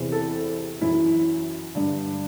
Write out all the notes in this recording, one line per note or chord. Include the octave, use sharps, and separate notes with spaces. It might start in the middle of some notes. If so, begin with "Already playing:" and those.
Already playing: E2 C3 E3
A4
F#2 E3 E4
G2 D3